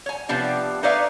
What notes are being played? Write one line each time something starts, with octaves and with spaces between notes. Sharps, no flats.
C#5 G#5
C3 F3 B3 D4 G4
D#4 B4 C#5 D5 E5 F5